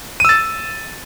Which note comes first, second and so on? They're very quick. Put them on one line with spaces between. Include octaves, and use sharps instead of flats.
D#7 E6 A6